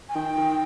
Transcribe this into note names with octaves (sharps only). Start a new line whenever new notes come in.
G#5
D#3 G5
D#3